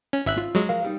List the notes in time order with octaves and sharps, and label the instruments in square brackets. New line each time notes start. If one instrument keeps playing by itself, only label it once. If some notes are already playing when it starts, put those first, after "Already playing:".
[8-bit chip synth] C#4
G#1 E5 F#6
[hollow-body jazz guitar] F4
[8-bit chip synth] F#3 G#3
[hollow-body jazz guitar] F3 A#4 F5
G3 D#4